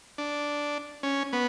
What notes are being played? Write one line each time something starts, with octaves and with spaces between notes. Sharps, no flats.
D4
C#4
B3